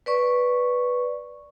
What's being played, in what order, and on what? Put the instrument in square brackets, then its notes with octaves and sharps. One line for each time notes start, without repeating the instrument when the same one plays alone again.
[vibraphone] B4 D5 C#6